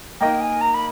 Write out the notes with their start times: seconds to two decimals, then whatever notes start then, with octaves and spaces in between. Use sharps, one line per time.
0.21 A#3 D#4 A#4 D#5 G5
0.41 G#5
0.61 A#5
0.74 B5